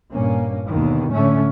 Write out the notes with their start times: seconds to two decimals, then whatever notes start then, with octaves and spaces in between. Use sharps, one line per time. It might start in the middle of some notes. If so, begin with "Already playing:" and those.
0.13 G2 A#2 A#3 C#4
0.69 D#2 B2 D3 D#3
1.12 A2 D3 A3 C#4